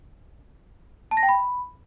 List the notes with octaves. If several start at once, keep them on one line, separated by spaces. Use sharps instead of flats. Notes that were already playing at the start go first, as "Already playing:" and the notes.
A5
A#6
G5
B5